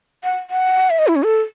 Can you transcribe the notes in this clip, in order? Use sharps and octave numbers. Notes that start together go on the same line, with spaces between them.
F#5
F#5
E5
D#5
E4
C#4
A4